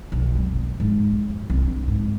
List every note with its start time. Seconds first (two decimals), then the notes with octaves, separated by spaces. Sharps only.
0.12 B1
0.35 F1
0.56 A#3
0.80 G#2
1.12 B3
1.29 F#2
1.50 C2
1.62 D4
1.88 G#2